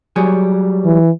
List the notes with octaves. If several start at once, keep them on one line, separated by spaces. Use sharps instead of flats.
F#3 G3 G#4
E3